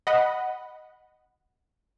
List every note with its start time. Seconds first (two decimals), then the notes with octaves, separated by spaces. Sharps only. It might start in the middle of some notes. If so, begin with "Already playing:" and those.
0.07 D#5 F#5 B5